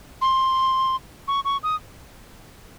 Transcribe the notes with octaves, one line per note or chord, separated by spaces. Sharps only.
C6
C#6
C#6
D#6